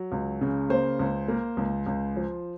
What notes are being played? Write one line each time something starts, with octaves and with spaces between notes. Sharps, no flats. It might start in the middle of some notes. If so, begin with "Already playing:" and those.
Already playing: F#3
C#2
C#3
A#3 C5
C#2
A#3
C#2
C#2
F3